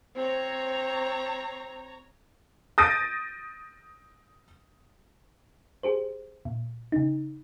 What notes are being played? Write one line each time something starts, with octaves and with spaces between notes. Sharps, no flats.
C4 C#5 A#5
D#6 G6 A6 A#6 D7 D#7
G4 G#4 C5
A#2
C#3 D#4